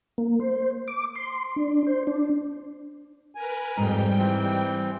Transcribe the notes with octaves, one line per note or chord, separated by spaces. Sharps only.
A#3
C5
D6
C6
D4
C5
D4
A#4 B4 G#5
F2 G#2 G3 D#5 G5 A#5
E3 C4